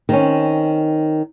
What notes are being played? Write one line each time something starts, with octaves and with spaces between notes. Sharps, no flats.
D#3 C4 C#4